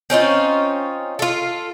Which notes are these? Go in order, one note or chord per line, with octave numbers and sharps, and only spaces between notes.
C4 C#4 D#4 F4
F4 A4